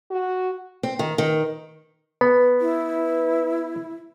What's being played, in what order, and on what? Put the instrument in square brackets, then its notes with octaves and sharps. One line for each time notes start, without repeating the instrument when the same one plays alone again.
[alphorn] F#4
[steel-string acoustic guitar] C4
D#3
D#3
[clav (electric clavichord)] B3 [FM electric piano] B4
[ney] E4